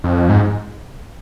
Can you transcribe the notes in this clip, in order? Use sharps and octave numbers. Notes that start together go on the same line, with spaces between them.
F2
G#2